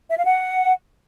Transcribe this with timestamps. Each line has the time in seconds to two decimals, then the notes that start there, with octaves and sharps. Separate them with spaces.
0.10 E5
0.18 F5
0.26 F#5